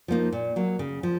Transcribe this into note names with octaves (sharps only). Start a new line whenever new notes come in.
F3 A#3 D#4
A#2
F#3 A#3
C#3
F3